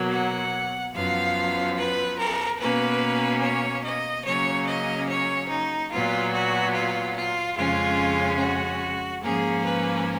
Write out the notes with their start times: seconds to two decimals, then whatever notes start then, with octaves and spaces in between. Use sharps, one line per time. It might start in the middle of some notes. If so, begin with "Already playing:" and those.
Already playing: B2 F#3 A#3
0.10 F#5
0.93 F#2 F3 B3 F5
1.76 B4
2.17 A#4
2.58 B2 A#3 C#4 B4
3.41 C#5
3.83 D#5
4.24 C#3 F#3 A#3 C#4 C#5
4.66 D#5
5.08 C#5
5.49 D#4
5.91 A#2 F#3 B3 F4
6.32 F#4
6.73 F4
7.14 F4
7.55 F2 C#3 G#3 C#4 F4
8.38 F#4
9.22 G#2 F3 A#3 C#4 G#4
9.63 B4